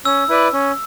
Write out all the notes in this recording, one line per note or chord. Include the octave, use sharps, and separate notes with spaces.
C#4 E6
E4 B4 D5
C#4